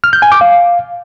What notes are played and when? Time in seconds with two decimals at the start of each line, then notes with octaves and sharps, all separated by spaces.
0.04 F6
0.13 G6
0.22 G#5
0.32 D6
0.41 F5